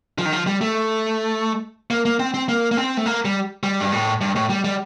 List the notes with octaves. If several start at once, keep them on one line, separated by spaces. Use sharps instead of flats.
F3
D#3
F3
G3
A3
A#3
A#3
C4
C4
A#3
A#3
C4
A3
A#3
G3
G3
G2
A2
G2
A2
G3
G3